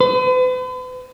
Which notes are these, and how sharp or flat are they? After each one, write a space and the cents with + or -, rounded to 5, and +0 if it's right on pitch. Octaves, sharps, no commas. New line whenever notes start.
B4 +45